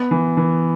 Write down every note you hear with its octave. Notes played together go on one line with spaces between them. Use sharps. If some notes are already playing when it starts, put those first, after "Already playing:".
Already playing: B3
E3
E3